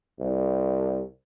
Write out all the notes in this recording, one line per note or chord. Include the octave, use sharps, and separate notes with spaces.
C2